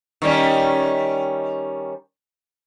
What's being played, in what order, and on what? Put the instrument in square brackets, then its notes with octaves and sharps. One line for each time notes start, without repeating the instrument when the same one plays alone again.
[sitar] D#3 G3 C#4